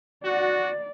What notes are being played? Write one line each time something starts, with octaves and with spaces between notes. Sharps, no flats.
F#4 D5